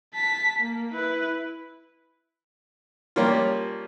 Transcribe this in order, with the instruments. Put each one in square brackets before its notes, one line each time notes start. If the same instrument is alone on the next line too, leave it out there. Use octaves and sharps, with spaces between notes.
[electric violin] A5 B6
A#3
E4 B4
[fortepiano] F3 G3 A#3 C#4 F4